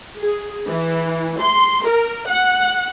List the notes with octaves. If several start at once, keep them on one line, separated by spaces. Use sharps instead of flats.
G#4
E3
C6
A#4
F#5